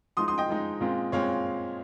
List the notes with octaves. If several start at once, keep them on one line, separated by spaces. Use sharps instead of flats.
F3 G#3 D#4 C6 D#6
C6 D#6
D#5 G5
F3 G#3 D#4
A#2 G#3 C4 F4
A#2 G#3 C4 F4 C#5 F5